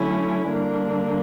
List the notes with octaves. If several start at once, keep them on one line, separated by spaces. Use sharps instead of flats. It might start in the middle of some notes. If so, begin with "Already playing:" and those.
Already playing: D3 F#3 A3 C#4 E4
D3 G3 A#3 D4